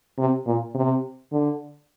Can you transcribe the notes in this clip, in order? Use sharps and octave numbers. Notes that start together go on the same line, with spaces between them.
C3
A#2
C3
D3